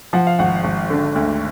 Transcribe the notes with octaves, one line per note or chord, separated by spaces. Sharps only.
F3 F#5
F5
G#1 F#5
G#1
D3
D2